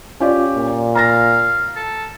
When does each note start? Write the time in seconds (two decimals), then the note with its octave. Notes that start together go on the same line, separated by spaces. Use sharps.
0.21 C#4 F4 G4 D5
0.56 A#2
0.95 F5 A#5 A6 A#6
1.76 A4